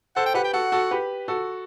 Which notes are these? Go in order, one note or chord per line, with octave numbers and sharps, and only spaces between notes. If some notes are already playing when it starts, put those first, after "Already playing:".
A4 C5 F#5
G5
G4 B4 F#5
G5
F#4 A4 F#5
F#4 A4
G4 B4
F#4 A4